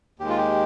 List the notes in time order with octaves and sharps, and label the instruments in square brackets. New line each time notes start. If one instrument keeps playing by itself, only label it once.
[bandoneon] D#2 D#3 G#3 G4
F4
G4